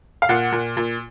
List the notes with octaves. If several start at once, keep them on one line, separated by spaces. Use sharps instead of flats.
F5
A#2 F#5
A#2
A#2